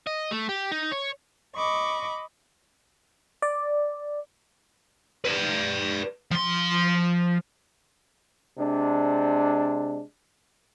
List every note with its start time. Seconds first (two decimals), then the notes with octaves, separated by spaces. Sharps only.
0.07 D#5
0.31 A3
0.49 G4
0.72 D#4
0.92 C#5
1.57 D#5 B5 C#6 D6
3.42 D5
5.24 B4 D5
6.31 F3 C6
8.58 C3 G#3 D4